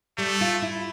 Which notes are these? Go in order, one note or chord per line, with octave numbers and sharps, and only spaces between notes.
G3 A3
F4
E4